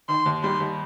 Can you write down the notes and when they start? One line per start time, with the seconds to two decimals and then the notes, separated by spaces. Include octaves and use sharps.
0.08 D#3 C6
0.26 D#2
0.43 G3 C6
0.60 D#2